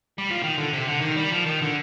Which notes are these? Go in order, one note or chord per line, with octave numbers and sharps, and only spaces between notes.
G3
F3
D#3
D3
C3
D3
D#3
G3
F3
D#3
D3